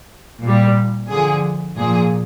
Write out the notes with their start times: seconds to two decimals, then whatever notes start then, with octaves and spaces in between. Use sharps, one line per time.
0.42 A#2
0.48 G3
1.10 D3 F3 G#4
1.77 A#2 F3 G#4